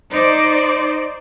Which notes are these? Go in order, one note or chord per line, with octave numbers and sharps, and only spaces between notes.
D#4 C5 D5